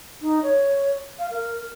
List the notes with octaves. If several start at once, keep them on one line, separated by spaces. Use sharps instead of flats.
D#4
C#5
F5
A#4